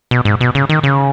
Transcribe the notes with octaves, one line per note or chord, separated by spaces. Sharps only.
B2
G#2
B2
C#3
D#3
C#3